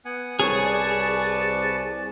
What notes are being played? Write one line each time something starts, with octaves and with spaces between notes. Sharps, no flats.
B3 F#5 G#5
C2 G#4 B4 C#5 A5 C#6
D5